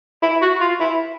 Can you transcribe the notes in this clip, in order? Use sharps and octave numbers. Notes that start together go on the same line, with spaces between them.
E4
F#4
F4
E4